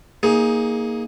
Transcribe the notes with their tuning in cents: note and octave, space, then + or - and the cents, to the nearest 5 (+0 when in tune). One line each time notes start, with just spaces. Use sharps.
A#3 +0 D#4 +20 G#4 +0